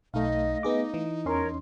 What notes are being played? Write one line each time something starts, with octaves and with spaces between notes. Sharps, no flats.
B1 A3 D#4 D#5 F5
B3 D#4 G#4 D6
E3
E2 C#4 A#4 C#5 C6